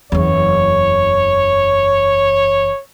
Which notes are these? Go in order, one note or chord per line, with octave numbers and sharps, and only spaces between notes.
F#1 E2 C#5